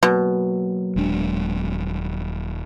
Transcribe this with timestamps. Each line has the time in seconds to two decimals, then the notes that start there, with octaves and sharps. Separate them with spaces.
0.03 B2 F#3 A#3
0.96 D#1 G#3 D4